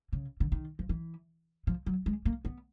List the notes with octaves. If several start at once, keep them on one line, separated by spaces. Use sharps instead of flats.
C#3
D3
D#3
F3
E3
F3
F#3
G#3
A#3
B3